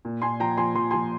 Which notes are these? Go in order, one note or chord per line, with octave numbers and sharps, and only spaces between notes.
A#2
A#2 G#5 C6
F3 G5 A#5
F3 G#5 C6
F3 C6
G#5 C6
F3